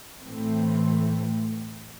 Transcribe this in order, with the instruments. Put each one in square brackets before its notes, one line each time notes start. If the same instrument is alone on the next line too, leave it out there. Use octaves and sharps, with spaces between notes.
[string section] A2 E3 A3 C4